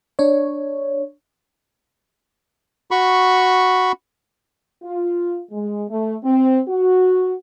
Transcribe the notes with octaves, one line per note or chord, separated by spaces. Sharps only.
D4 C#5
F#4 B5 C#6
F4
G#3
A3
C4
F#4